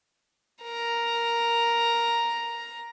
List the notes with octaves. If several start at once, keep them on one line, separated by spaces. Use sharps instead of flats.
A#4 A#5